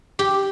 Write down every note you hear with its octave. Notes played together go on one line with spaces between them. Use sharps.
G4